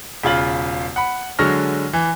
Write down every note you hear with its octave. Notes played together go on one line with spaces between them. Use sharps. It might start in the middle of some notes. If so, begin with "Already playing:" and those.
E1 C#3 F4 F#7
F#5 B5
D3 F#3 G#3 C#6 F6 A#6
E3